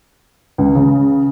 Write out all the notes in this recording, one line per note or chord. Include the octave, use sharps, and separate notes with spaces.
C#2
C#3